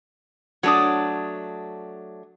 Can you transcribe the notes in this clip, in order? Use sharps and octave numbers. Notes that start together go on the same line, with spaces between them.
F#3 A3 D4 C#5 D#6